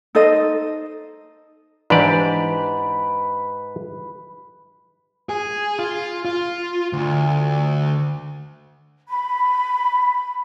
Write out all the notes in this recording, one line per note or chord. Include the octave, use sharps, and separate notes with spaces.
D#4 A4 C5 D#5
G#2 E3 D4 G4 B4 D5
G#4
F4
F4
D2
B5